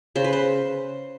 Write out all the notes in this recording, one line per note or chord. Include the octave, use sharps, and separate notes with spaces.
C#3 C5
B4
C5